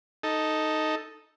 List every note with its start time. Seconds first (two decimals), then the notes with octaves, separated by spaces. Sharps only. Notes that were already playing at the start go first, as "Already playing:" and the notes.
0.23 D#4 A4